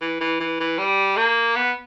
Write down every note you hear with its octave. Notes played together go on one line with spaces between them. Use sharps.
E3
E3
E3
E3
G3
A#3
B3